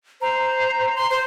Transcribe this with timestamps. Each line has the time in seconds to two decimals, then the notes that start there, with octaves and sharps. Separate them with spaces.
0.21 C5 A#5
0.96 C6
1.10 C5